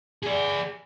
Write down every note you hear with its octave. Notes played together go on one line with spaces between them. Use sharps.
G#4 D5